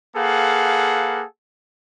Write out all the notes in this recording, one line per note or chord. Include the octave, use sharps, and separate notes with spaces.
A#3 G#4 A4 B4 F5 F#5